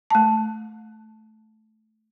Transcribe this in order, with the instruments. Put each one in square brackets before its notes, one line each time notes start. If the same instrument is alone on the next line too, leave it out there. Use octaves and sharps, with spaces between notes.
[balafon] A3 A5